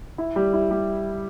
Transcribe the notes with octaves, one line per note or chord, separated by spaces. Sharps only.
E4
G3
E4
G3